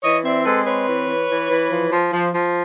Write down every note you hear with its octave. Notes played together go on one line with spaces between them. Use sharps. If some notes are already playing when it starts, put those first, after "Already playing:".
E3 C#5 D#5
C4 D5 E5
G#3 A4 B4
C4 B4 C#5
E3
E3
E3
E3
F3
F3
F3
F3